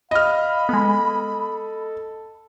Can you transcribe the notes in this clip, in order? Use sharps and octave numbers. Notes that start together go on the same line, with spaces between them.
D#5 F5 B5 F6
G#3 B3 A4